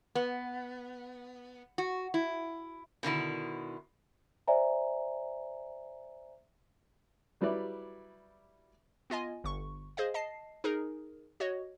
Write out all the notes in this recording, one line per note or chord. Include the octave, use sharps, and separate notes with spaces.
B3
F#4
E4
B2 D3 D#3 E4
C5 D5 E5 G#5 A#5
F#3 G3 E4 B4 D5
B3 F4 D#5 G#5
G1 C#6
G#4 C5 D#5 F5
D#5 A5 C7
D#4 G#4 A#4
F#4 C#5 D#5